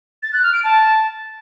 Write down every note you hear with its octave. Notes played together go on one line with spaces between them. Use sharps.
A6
F#6
F6
D7
A5